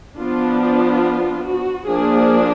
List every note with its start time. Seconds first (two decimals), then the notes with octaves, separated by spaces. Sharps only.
0.16 F3 B3 D4 F4
0.59 F4
1.44 F#4
1.86 F3 A#3 D4 G#4